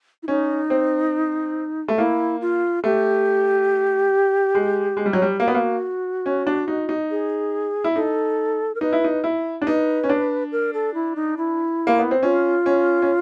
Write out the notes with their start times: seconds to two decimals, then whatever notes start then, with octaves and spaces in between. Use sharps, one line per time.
0.23 E4
0.28 C#4 D#4
0.70 C4
1.88 A3
1.98 A#3 E4
2.41 F4
2.84 A3 G4
4.55 G#3
4.97 G#3
5.06 G3
5.13 F#3
5.22 G3
5.40 A#3 F#4
5.47 B3
5.54 A#3
6.26 C#4
6.47 D4
6.68 D#4
6.89 D#4
7.11 G#4
7.84 E4
7.96 D#4 A4
8.75 A#4
8.81 D#4 B4
8.93 E4
9.04 D#4
9.24 E4
9.62 D4
9.67 D#4 B4
10.04 C#4
10.09 D4
10.52 A#4
10.73 A4
10.94 E4
11.16 D#4
11.37 E4
11.87 A#3
11.99 B3
12.11 C4
12.23 C#4 F4
12.66 C#4
13.02 C#4